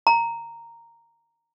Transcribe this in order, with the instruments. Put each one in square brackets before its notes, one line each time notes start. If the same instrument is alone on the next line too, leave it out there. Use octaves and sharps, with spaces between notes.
[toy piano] A#5